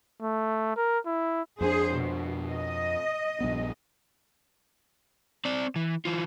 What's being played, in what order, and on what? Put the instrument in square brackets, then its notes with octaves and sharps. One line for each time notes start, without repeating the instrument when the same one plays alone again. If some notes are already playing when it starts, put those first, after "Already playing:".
[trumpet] A3
A#4
E4
[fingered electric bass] F2 A#3 D4 [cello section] G#4 C5
[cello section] B2
D#5
[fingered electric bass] A#1 G2 B3
[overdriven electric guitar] C4 D5
E3
E3 F4